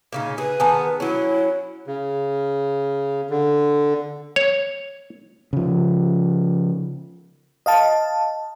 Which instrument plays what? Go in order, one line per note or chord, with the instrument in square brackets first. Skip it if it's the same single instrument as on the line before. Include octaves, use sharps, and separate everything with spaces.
[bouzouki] A#2 C#3 D#4
[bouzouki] G#4 [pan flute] B4
[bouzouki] D#3 B3 G#4 [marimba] G#5 A5
[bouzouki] F#3 C#4 [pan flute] E4
[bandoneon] C#3
D3
[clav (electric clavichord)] C#5
[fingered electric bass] C#3 F3
[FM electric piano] D#5 F5 A5